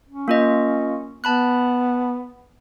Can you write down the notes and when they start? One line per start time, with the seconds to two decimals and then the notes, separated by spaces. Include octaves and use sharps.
0.08 C#4
0.28 A#3 F4 D#5
1.24 B3 A5 B5 F#6